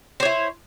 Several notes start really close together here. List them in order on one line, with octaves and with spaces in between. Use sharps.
C5 C#5 E4